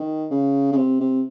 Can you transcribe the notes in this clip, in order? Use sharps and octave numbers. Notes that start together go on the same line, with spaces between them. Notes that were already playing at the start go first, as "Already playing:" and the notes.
Already playing: D#3
C#3
C#3
C3
C3